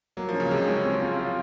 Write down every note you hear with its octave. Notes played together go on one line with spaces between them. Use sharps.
F#3 A#3
F3 C#4
C#3
C3 G#3
C#4
C4
F4
F4